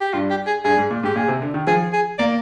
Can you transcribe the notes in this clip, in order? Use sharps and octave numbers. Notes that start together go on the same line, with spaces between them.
G4
G2 F4
G4
G#4
G2 G#4
G#2
A#2
G#2 G4
A#2 G#4
C3
D3
D#3
F3 G#4
G#4
A#3 D5